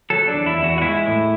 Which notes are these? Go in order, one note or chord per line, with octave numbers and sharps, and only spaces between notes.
F#3 A4
D4
E2
E4
E2
F#4
F#4
G#3 E4
A2